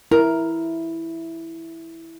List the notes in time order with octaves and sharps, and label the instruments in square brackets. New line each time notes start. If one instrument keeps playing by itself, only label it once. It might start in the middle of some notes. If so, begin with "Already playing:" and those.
[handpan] E4 [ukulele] A#4